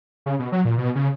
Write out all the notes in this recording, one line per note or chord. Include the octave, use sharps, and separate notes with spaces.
C#3
B2
F#3
A#2
B2
C#3